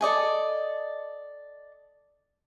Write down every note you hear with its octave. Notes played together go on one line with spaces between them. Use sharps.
A4 D5 D#5 G#5